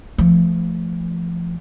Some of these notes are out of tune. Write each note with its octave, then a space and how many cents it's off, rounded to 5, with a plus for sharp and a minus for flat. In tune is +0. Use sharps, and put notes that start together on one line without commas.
F3 -30 A3 -10